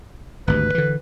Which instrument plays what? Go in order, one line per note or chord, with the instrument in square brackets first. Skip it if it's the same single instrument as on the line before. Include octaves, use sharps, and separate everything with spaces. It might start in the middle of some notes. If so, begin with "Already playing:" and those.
[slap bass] G#1 D2 G2 [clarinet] B4
[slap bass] D3 E3